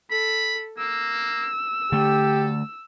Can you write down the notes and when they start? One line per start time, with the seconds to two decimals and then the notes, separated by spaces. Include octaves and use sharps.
0.11 A4 B5
0.78 A#3 E6
1.92 D3 A3 G4 A4